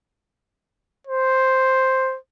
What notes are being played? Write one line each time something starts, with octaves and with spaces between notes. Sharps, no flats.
C5